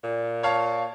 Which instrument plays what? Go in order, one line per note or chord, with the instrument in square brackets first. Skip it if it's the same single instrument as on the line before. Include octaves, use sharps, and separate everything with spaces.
[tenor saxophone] A#2
[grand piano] C#5 F5 A5